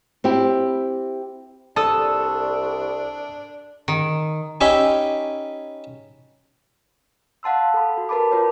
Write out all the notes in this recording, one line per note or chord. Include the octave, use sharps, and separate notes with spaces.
C4 E4 G4
C2 D4 A4 A5 D#6 E6
D#3
C#4 D#4 G4 E5 G#5 B5
F5 F#5 A5 C6 E6
A4 B5
F#4
A#4 B4 A5 B5 D6
F4 A#4 B4 C#5